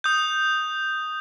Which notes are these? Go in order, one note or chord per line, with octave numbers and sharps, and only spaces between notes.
D#6 G6